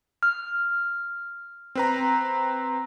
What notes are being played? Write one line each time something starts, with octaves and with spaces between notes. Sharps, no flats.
F6
C4 B4 A#5